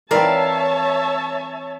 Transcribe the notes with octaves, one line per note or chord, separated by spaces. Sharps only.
E3 C4 A#4 C#5 D5 E5 F5 A5